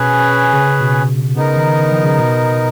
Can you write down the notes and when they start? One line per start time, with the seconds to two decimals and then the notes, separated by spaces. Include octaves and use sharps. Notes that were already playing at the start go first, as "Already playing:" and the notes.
Already playing: B2 C#4 G#4 B4
0.53 C#3
0.81 B2
1.36 C#3 B3 D#4 A#4
1.56 D#3
1.91 F3
2.04 C#3
2.19 B2